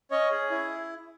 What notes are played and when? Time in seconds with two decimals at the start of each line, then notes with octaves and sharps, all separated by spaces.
0.11 C#4 C#5 D#5
0.31 G#4
0.50 E4